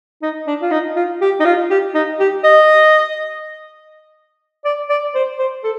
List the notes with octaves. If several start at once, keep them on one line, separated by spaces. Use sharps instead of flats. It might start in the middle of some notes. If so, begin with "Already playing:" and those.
D#4
D4
F4
D#4
F4
G4
D#4
F4
G4
D#4
G4
D#5
D5
D5
C5
C5
A4